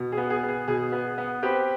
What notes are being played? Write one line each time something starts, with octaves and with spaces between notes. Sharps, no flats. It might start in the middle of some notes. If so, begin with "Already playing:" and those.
Already playing: B2
G#4
B3
G#4
B3
G#4
B2 G#4
B3
B3
C4 G4 B4